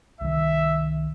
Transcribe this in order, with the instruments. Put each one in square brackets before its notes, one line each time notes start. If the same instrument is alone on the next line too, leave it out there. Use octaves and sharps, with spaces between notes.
[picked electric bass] C2 D#3 [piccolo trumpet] E5